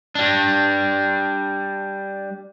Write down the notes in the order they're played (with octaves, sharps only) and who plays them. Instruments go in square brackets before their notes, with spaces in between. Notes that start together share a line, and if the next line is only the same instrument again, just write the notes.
[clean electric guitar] G3 D4